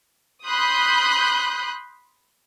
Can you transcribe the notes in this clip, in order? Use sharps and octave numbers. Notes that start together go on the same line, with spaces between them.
B5 C6 D#6 F#6 G6